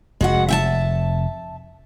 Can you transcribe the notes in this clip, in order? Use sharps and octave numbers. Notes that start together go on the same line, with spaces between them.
F1 G#3 F#4 F#5
E5 G5 A5